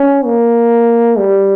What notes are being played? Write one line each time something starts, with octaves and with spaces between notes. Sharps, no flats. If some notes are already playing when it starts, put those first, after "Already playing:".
Already playing: C#4
A#3
G3